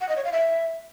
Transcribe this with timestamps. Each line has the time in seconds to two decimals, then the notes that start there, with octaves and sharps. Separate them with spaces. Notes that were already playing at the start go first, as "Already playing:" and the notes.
0.01 F#5
0.09 D#5
0.17 C#5
0.25 F5
0.32 E5